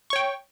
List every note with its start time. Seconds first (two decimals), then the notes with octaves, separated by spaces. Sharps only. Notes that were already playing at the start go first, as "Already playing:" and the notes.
0.10 C#6
0.13 C#5
0.16 G5